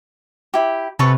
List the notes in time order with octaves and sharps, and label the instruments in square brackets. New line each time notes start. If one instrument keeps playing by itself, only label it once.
[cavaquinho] E4 G4
[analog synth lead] C3 [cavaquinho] A4 B4 C#5